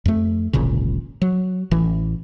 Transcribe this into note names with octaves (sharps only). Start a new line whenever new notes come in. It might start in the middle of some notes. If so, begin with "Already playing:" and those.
F2 A3
D1 G#1 A#2 C#3
F#3
A1 E3